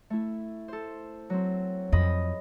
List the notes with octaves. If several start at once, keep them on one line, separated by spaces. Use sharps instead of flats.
A3 E4
A4 C5
F#3 C4
F2 D#5 B5